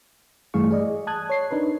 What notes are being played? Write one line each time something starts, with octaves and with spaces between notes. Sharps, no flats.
G2 E3 A3 G#4 F5 C#6
G#4 D5 D#5
A5 D#6 F#6 G#6
C#5 C7
D4 D#4 A#4 B4